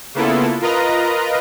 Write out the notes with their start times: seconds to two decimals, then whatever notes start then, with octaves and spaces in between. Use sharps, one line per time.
0.15 C#3 A#3 B3 E4 F4 A4
0.61 F4 A#4 B4 D#5 A#5